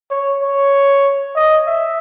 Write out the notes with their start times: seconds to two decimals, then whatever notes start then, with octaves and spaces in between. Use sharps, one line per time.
0.11 C#5
0.42 C#5
1.36 D#5
1.67 E5